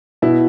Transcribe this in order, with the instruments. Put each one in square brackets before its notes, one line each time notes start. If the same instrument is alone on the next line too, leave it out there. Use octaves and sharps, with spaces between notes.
[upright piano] B2 E4